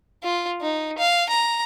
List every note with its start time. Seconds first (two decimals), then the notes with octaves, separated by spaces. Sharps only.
0.23 F4
0.61 D#4
0.98 F5
1.29 A#5